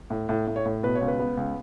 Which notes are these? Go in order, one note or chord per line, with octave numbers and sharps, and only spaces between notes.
A2
A2
A2
C#5
A2
B2 B4
C#5
C#2
B4
B3
C#2